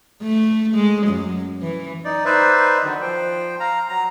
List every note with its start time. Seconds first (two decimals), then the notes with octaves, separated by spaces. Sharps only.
0.22 A3
0.75 G#3
1.08 F#2
1.62 E3
2.05 D#4 D5
2.25 D#4 B4 C5 D5 E5
2.84 D3 D#3 F#3
3.02 F3 C5 G5
3.60 F5 A#5
3.89 F#3 A#5